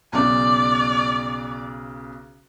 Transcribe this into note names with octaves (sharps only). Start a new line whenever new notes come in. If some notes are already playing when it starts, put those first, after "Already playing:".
B1 C#3 D5